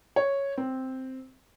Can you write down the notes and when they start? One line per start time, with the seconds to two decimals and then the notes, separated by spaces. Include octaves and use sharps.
0.16 C#5
0.57 C4